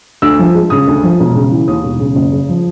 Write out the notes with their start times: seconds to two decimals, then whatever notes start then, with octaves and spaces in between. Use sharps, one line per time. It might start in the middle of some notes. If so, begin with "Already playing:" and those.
0.22 D2 E6
0.39 F3
0.54 G#3
0.70 C#3 D#6
0.88 D2
1.03 F3
1.19 E1
1.35 C#3
1.51 E3
1.68 D#2 D#6
1.83 E1
1.99 C#3
2.15 F#1
2.32 C#3
2.49 F3